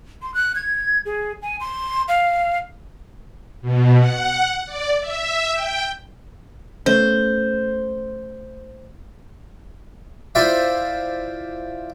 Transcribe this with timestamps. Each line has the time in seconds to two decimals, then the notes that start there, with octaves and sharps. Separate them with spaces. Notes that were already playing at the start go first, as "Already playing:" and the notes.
0.22 C6
0.34 F#6
0.55 G#6
1.05 G#4
1.42 G#5
1.60 C6
2.08 F5
3.61 B2
3.98 F#5
4.65 D5
5.00 E5
5.53 G5
6.86 A3 B3 C#4 C5
10.35 E4 F4 C5 D5 E5